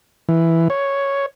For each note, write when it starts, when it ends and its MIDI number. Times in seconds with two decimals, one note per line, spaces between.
0.29 0.68 52
0.70 1.26 73